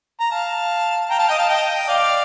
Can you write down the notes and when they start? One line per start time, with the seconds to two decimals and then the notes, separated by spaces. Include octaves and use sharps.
0.20 A#5
0.30 F5 A5
1.10 G5 A#5
1.19 F5 A5
1.29 D#5 G5
1.39 F5 A5
1.49 D#5 G5
1.88 D5 F5